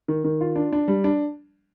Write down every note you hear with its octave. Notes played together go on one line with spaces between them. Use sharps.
D#3
D#3
F4
D4
D4
G3
D4